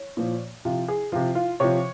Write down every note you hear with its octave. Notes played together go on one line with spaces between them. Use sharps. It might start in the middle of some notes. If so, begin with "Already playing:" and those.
Already playing: C#5
A#2 F3
C3 F3 F4
G#4
C3 F3 F4
F4
C3 F3 C#5